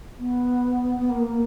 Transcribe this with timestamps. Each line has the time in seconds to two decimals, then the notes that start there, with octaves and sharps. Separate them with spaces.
0.17 B3
0.96 B3
1.09 A#3
1.23 A#3